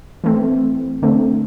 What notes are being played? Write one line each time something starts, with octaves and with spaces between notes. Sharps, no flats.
E3 A3 C4
D3 A3 C4